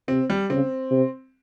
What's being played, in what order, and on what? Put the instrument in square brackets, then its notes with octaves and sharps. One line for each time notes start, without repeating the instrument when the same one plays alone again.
[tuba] C3 [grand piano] C4
[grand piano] G3
[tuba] C#3 [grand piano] C4
[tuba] C3